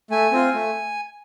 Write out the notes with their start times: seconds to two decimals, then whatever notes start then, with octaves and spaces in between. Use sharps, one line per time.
0.11 A3 G#5
0.32 C4 F4
0.54 A3